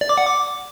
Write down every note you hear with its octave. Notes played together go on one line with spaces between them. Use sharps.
D5
D6
F#5
D6